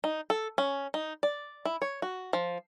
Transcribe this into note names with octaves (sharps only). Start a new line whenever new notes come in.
D#4
A4
C#4
D#4
D5
E4
C#5
F#4
F3